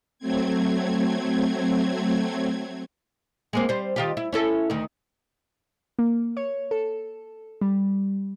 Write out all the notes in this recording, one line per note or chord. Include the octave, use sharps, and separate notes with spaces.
F#3 A3 C4 G#6
G#3 A#3 C4
G3 C5
D#3 F4 G4
E4
C#4 E4 A4
D2 D#3
A#3
C#5
A4
G3